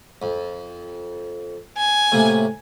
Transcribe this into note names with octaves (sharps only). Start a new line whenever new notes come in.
F2
G#5
A2 C3 A#3